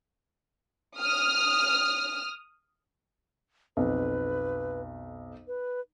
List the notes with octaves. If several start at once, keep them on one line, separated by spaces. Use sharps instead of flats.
D#6 F6
B1 F2 B4
B4